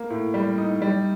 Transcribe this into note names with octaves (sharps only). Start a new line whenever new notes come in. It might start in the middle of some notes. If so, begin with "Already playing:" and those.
Already playing: A#3
A2
G3
D#4
G3